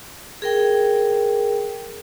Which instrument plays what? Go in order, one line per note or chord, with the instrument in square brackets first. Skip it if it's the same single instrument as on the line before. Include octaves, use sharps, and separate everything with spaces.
[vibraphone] G#4 A#4 G5